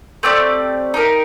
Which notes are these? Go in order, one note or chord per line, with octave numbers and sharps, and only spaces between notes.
A3 C4 G4 D5
D#4 G4 A#4